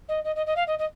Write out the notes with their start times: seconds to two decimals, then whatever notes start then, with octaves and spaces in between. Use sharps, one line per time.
0.08 D#5
0.24 D#5
0.35 D#5
0.46 D#5
0.56 F5
0.67 D#5
0.78 D#5